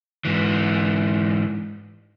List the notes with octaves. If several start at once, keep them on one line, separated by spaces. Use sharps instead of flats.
G#2 E3